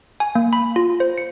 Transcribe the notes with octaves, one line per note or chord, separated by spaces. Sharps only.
G#5
A#3
B5
F4
C5
C#7